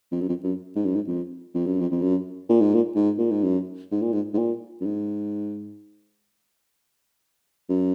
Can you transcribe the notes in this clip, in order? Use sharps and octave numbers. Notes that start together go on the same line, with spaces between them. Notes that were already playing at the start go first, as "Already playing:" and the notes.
F2
F#2
F2
F#2
G#2
F#2
G#2
F2
F2
F#2
F2
F2
F#2
A#2
G#2
A#2
G#2
A#2
G#2
F#2
G#2
A#2
G#2
G#2
A#2
F#2
G#2
F#2